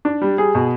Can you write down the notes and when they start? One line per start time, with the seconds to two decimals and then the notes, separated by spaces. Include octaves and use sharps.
0.05 D4
0.22 G3
0.38 G#4
0.55 B2